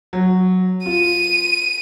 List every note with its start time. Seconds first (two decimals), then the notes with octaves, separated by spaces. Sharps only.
0.13 F#3
0.86 F4 D#7